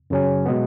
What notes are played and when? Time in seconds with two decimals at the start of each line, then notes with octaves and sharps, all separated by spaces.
0.10 F#2 C#3 F#3 C#4
0.45 B2 G#3 B3